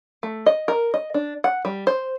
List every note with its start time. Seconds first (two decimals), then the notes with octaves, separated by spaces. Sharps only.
0.23 A3
0.46 D#5
0.68 A#4
0.94 D#5
1.14 D4
1.44 F#5
1.65 G3
1.87 C5